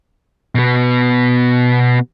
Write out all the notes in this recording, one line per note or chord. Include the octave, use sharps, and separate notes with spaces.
B2 B3